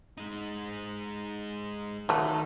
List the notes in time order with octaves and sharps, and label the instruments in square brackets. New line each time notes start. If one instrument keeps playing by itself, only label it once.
[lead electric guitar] G#3 D#4
[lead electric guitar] D#3 [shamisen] F#3 A3